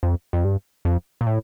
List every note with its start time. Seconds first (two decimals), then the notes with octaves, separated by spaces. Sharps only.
0.03 F2
0.33 F2
0.44 G2
0.85 F2
1.21 A#2
1.26 A2